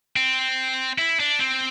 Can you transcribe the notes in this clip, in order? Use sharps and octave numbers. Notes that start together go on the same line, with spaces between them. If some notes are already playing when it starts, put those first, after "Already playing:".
C4
E4
D4
C4